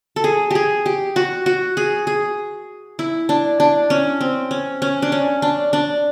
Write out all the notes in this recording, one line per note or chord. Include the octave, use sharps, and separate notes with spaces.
A4
G#4
G4 G#4
G4
F#4
F#4
G#4
G#4
E4
D4
D4
C#4
C4
C#4
C#4
D4
C#4
D4
D4